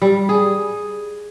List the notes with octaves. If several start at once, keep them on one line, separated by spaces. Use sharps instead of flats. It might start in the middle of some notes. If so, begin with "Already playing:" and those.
G3
G#4